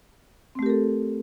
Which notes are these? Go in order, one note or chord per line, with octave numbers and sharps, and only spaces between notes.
A3 C4 G4 A4 A#4